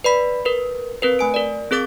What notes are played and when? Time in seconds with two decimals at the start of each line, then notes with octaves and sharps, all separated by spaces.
0.04 B4 D5 B5 B6
0.45 A#4 B4
1.02 C4 A#4 B4
1.19 A3 G#5 D7
1.34 A#4 D5
1.71 C4 G#4 A#4 D6 A6